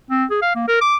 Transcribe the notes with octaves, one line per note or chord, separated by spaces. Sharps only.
C4
G#4
F5
A#3
A#4
D6